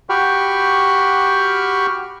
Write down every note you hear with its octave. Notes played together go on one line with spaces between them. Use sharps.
F#4 G4 G5 B5 C#6 F6